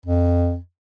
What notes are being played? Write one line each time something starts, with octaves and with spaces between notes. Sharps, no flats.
F2